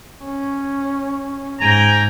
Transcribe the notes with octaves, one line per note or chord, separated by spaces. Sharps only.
C#4
G#2 G5 G#5 A#5